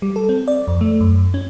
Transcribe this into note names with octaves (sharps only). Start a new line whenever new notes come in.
G3
A4
C4
D5
F2
A3
F#2
C#4